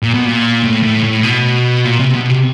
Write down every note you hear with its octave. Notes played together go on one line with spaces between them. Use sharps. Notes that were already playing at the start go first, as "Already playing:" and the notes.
A#2
B2
A#2
A2
A2
A2
B2
A#2
C3
B2
C3